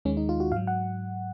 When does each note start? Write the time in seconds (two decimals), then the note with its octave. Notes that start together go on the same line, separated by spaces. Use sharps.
0.05 D#2 D#3 G#3 C#4
0.17 D#4
0.29 F4
0.40 F#4
0.52 G#2 F#3 F5
0.67 F#5